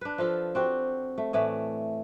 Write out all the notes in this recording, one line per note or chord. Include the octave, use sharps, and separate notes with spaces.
D4 B4
F3 F4 A4
C4 F#4 G4
A3
A2 E3 A3 D5